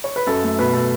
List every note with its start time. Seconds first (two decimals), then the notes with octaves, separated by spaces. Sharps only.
0.04 C#5
0.16 B4
0.27 F#2 A4
0.44 A3
0.59 B2 B4
0.74 A3 A4